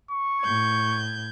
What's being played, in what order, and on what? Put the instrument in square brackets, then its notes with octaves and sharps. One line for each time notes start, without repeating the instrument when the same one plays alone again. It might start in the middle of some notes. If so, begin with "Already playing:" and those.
[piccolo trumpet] C#6
[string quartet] A2 G6 G#6